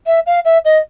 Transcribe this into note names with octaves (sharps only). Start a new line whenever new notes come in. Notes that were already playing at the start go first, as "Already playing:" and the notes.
E5
F5
E5
D#5